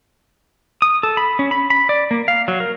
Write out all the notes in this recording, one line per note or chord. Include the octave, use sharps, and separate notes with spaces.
D#6
A4
B5
C#4
B5
B5
D5
A#3
F5
F#3
A#4